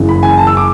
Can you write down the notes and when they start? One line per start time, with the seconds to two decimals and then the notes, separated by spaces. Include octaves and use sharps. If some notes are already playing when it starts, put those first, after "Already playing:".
Already playing: F#1 F#2 E3
0.09 B5
0.23 G#5
0.38 A5
0.47 E6
0.57 D6